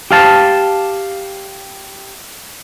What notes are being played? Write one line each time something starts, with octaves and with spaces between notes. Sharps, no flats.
G4 F5 A5